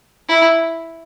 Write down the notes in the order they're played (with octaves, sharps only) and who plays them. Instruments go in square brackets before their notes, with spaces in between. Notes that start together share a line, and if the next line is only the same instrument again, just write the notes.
[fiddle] E4